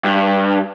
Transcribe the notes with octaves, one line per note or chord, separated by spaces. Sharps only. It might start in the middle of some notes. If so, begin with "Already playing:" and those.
G2